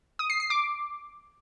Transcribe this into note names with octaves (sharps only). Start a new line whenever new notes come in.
D#6
C7
C7
D6